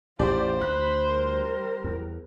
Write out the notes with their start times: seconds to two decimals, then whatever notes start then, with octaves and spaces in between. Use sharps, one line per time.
0.19 A1 E2 A2 F4 G4 C5 D5
0.61 D2 B5 F#6
1.09 G3 A#4
1.84 E2